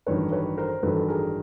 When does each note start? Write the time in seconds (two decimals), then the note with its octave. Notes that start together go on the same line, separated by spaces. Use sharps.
0.06 A1 G2 D#3 F#3 B4 C#5
0.31 B4 C#5
0.58 A#4 C5
0.83 A1 G2 D#3 F#3 A4 B4
1.08 G#4 A#4